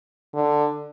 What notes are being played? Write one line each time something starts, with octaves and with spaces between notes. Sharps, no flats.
D3